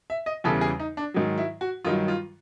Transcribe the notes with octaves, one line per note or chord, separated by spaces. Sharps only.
E5
D#5
E2 C#3 E3 G3 A4
G#4
D#4
D4
G#2 D#3 F#3
E4
F#4
G2 D#3 F#3 F4
F4